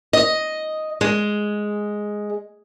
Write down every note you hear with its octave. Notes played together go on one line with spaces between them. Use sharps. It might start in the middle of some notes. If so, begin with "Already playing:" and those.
D#5
G#3